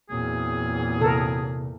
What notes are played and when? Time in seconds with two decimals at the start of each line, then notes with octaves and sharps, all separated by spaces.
0.10 E2 A#2 F#3 C4 G#4
1.01 C3 A4 A#4